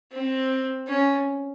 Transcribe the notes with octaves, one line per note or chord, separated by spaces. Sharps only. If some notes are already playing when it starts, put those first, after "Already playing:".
C4
C#4